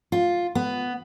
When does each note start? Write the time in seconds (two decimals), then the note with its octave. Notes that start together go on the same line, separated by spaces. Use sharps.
0.12 F4
0.55 B3